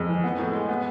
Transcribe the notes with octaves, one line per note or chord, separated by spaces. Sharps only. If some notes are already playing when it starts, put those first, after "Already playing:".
Already playing: F2 G#3
E3
B3
A2
G#3
B3